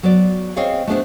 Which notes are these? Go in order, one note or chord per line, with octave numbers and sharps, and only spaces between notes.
F#3 B3 F#4 D5
C4 G#4 C5 C#5 D#5 F5
A3 B3 D4 G#4 C5 F#5